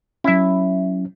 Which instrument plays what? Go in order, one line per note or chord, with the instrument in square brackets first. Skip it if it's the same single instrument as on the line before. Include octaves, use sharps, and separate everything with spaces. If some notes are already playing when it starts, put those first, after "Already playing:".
[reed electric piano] F#3 C#4 [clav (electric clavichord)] E4 E5